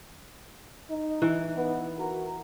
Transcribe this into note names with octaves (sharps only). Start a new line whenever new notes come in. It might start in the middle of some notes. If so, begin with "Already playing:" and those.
D#4
E3
B3
F#4 A#4